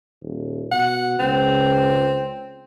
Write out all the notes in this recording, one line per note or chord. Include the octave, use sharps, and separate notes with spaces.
D#1
B2 F#5
C#2 C4